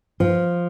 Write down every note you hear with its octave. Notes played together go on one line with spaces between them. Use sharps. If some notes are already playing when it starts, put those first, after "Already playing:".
F3